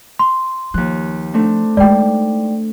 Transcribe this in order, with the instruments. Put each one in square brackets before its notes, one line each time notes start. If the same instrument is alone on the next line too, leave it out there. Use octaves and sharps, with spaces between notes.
[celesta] C6
[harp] D#2 F#6 [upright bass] F3
[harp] A3 C4 D4
[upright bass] G#3 D#4 [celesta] D5 G5